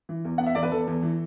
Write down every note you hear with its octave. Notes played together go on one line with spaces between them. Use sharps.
E3
E2
B3 F#5
E5
E2 D5
B4
E2 A4
E2
E3